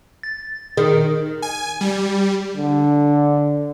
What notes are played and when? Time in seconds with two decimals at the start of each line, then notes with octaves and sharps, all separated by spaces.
0.23 A6
0.77 D#3 G#4
1.42 G#5
1.81 G3
2.56 D3